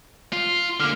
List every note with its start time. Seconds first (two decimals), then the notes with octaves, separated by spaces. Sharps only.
0.33 F4
0.80 D3 A#3 F6